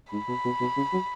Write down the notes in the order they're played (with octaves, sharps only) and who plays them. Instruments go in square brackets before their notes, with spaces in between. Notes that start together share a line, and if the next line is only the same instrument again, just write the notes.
[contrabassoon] G#2 [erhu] B5
[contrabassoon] B2
B2
B2
C#3
F#3